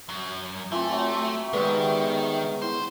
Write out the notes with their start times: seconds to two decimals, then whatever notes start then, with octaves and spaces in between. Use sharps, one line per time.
0.09 F#2
0.72 E3 A3 C4 F4
0.92 F#3 E5
1.53 D#3 G3 G#3 B3
2.62 E4 C5